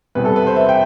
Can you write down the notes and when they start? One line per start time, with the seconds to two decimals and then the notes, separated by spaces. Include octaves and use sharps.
0.15 E2 C3 E3 G3 B3 B4
0.25 A4
0.36 B4
0.47 C5
0.56 E5
0.69 G5